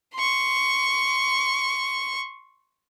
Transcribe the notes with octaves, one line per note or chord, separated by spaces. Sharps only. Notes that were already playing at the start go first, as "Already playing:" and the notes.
C6 C#6